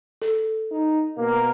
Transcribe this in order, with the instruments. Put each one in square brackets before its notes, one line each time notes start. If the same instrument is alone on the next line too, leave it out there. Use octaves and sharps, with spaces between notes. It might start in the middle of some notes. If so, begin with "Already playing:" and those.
[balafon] A4
[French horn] D#4
[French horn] B2 [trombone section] A#3